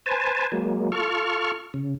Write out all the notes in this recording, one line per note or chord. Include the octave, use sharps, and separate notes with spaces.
B4 C5 G#5 A5
F#3 G#3 A#3
F4 A4 C#6 F6
C#3